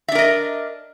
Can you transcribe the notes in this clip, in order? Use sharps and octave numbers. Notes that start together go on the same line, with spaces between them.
D4 A#4 D#5 E5